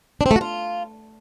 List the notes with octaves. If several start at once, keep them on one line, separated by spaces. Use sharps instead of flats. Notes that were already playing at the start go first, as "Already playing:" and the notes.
D4
C4
A3
F#4
F4